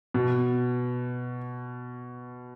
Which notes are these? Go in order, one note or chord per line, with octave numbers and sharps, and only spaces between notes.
B2